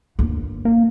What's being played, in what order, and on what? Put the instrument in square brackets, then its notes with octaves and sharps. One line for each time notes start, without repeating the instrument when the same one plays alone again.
[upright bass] G1 D#2
[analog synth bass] A#3